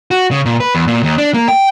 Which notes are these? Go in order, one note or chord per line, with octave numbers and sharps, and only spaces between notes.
F#4
C#3
A#2
B4
E2
A#2
D#2
D4
A#3
G5